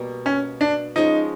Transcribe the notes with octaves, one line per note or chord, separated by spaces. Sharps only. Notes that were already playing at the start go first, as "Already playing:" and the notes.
Already playing: B2 G3 A#3
C#4
D4
F3 G#3 C#4 D#4